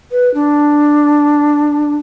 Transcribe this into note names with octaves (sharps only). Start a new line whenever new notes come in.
B4
D4